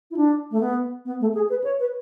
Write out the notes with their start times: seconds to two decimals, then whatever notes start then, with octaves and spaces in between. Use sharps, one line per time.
0.11 E4
0.17 D4
0.51 A3
0.60 B3
1.05 B3
1.21 A3
1.35 G#4
1.50 B4
1.64 C#5
1.80 B4